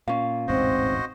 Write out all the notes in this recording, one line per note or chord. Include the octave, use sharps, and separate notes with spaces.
A#2 C#4 F5
E1 A1 G#2 C4 F#4 C5 D#5